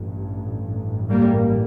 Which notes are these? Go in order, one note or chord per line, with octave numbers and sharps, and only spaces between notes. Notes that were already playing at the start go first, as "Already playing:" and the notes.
Already playing: A1 G2
G3 A#3